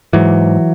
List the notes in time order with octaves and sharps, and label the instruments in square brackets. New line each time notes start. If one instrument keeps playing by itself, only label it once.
[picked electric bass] G#2 E3 F#3